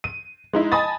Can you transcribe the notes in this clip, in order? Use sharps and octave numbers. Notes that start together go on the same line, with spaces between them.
D#7
G#3 D#4 E4
D#5 G#5 A5 B5 D#6 A6